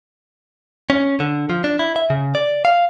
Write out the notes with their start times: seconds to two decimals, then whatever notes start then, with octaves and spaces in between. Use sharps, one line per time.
0.90 C#4
1.20 D3
1.50 F3
1.64 D4
1.79 E4
1.96 E5
2.10 C#3
2.35 D5
2.65 F5